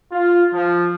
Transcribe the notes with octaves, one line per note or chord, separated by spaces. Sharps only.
F4
F3